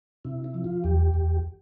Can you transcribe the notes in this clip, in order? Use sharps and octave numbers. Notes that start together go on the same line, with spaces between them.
C3 E4
E4
F3
F4
E2 G4
E2